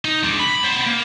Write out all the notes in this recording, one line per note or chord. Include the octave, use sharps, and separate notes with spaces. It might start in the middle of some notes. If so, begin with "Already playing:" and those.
D#4
G#3 D4
B5
B3 C5
A#3